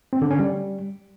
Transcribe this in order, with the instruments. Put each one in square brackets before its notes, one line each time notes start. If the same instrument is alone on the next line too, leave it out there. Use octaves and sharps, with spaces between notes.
[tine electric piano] C4
D3
C#4
G3